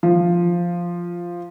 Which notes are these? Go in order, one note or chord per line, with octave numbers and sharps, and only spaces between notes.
F3